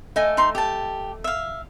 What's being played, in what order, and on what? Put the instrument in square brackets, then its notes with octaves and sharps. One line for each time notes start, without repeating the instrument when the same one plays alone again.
[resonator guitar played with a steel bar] A3 D#5 G#5
[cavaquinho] D#4 C6
G4 A5
E5 F5